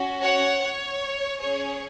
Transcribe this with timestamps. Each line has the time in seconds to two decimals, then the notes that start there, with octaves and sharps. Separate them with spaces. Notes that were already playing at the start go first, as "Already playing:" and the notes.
Already playing: C#4 F#4
0.22 C#5 F#5
0.63 C#5
1.40 C#4 G#4 C#5